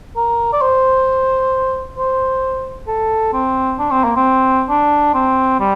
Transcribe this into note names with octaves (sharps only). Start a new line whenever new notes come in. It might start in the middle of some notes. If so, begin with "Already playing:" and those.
A#4
D5
C5
C5
A4
C4
D4
C4
A#3
C4
D4
C4
G3